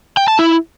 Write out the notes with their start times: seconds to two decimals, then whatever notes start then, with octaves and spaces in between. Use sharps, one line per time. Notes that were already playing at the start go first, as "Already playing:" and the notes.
0.17 G5
0.28 A5
0.39 E4